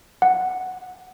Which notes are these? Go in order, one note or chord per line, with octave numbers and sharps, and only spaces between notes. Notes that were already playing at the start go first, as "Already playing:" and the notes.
F#5